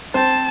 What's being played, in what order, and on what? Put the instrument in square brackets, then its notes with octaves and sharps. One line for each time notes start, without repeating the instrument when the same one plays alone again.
[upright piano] C4 C5 [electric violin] A5